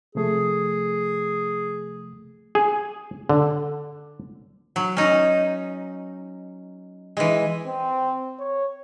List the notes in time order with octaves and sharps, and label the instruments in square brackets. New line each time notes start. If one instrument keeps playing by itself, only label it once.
[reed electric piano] C3 F3 A3 [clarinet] G#4
[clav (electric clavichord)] G#4
D3
[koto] F#3
C#4 D#4
E3 G#3
[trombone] C4
C#5